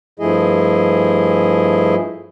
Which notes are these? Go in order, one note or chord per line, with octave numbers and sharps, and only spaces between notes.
G2 F3 A3 E4 G#4 D#5